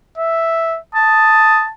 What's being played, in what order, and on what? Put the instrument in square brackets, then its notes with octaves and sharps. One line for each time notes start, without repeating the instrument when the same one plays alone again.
[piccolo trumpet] E5
[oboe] A5 [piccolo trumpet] D#6